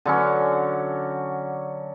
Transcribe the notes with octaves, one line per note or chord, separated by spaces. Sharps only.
D3 F#3 C#4